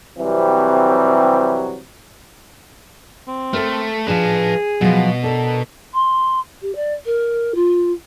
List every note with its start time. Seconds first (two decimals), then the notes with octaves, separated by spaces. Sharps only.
0.17 C3 E3 F#3 G3 C4
3.28 C4
3.53 A3 A4 A#4
4.08 F3 D4 G#4 B4 A5
4.81 B2 F3 F#3
5.24 D4 A4 A#4
5.94 C6
6.62 G4
6.76 D5
7.06 A#4
7.55 F4